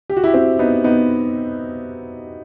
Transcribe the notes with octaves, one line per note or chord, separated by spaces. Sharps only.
G4
F#4
E4 G4
C4 E4
B3 D#4
B3 D#4